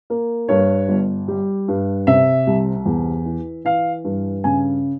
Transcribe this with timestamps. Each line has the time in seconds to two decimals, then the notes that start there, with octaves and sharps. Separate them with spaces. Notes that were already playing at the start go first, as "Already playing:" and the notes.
0.10 A#3
0.48 G2 C#5
0.88 G1
1.28 G3
1.68 G2
2.07 C3 E5
2.47 C2
2.86 E2
3.25 E3
3.65 E3 F5
4.04 G2
4.44 C#3 G#5